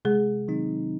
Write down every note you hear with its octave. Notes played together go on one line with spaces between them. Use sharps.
C3 G#3 G#4
D#3 F#3 C4 D#4